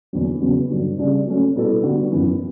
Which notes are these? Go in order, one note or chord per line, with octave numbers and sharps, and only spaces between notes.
E2 D3 F#3
E2 C#3 F#3 B3
G2 D3 F#3
C#3 G3 D4
F#3 A3 C#4
B2 G3 B3 E4 A4
D3 G3 B3 F#4
F#2 E3 B3